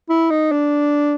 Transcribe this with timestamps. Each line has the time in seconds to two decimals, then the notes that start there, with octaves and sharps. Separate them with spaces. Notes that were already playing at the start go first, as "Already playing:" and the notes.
0.09 E4
0.30 D#4
0.52 D4